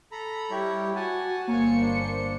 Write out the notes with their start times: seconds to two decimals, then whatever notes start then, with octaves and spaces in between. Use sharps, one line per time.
0.12 A4 A#5 B5
0.51 G3 E4 G4 C#5
0.95 F#4 F#5 G#5 A5
1.48 G1 A#3 C5 C#5 G#5 C#7
1.81 D4